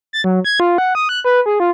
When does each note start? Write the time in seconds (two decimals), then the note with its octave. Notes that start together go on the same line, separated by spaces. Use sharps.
0.13 A6
0.24 F#3
0.45 G#6
0.60 F4
0.78 F#5
0.95 D#6
1.09 F#6
1.25 B4
1.46 G#4
1.60 F4